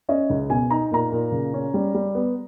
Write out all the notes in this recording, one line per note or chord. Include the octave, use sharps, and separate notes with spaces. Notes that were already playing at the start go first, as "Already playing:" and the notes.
C#4 D#5
C#2
B2 G#5
D#4 A#5
A#2 A#5
A#2
C#3
C#4
G3
G3
B3